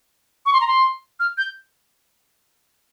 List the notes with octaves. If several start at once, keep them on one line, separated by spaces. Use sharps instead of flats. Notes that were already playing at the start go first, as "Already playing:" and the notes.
C#6
C6
A#5
C6
F6
G6